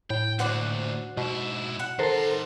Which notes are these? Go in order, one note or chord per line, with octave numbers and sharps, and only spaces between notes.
A2 G5
D2 A#2 F#4 C5 D5
G#2 B2 E4
F#5
D#3 A4 A#4 C5 C6